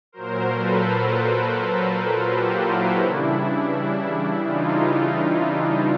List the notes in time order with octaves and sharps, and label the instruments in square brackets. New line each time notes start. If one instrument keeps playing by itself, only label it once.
[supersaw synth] A#2 F#3 A#4 C5
A4 B4
A4 B4
F4 G4
E4 F#4
C#3 E3 G3 D4 E4
D#4 F4
D#4 F4